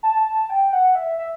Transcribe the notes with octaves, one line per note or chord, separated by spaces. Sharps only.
A5
A5
G5
F#5
E5
E5